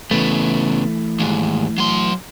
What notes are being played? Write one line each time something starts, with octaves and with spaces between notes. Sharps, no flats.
C#3 E3 A3 B3
D#2 G#2
F#3 C6